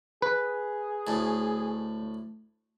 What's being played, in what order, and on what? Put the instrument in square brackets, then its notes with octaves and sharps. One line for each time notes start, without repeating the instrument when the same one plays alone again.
[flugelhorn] G#4 [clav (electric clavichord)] B4
[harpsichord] D2 A2